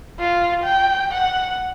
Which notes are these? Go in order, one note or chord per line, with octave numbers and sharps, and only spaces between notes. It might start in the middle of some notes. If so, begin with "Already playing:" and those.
F4
G5
F#5